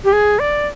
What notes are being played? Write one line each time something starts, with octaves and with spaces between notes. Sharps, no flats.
G4
G#4
D5